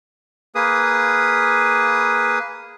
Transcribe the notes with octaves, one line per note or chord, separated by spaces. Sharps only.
A#3 G#4 B4 D#6